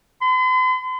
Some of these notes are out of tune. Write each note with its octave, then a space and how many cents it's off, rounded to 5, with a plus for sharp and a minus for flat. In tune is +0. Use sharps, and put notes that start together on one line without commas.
C6 -45